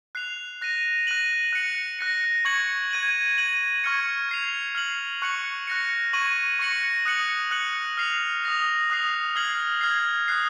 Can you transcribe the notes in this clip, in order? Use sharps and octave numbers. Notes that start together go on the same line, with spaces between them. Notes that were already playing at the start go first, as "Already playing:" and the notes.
F#6 C7 F7
F#6 A#6 D#7
F#6 A#6 D#7 F#7
F#6 C#7 F#7
F#6 A#6 C#7
C#6 G#6 C#7 F#7
G#6 D#7 F#7
G#6 D#7 F#7
C#6 F6 G#6 C#7
G#6 C7 F7
F6 C7 F#7
C#6 F#6 C#7 F#7
F#6 A#6 C#7
C#6 G#6 D#7 F#7
C#6 F#6 A#6 C#7 F#7
D#6 F#6 C#7 F#7
F#6 C#7 F#7
F6 C7 F7
D#6 A#6 F7
D#6 F#6 C7
F6 G#6 C7 F#7
F6 G#6 C7
D#6 F#6 C7